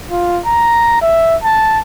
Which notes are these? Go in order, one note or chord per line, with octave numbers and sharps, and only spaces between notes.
F4
A#5
E5
A5